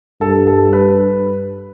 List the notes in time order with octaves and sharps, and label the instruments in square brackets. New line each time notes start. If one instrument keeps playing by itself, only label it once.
[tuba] G2 [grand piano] A4
[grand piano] A4
B4